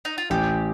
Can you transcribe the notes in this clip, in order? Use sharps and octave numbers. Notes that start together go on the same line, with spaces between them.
D#4
F4
A1 G4